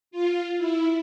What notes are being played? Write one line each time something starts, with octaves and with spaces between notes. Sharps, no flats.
F4
E4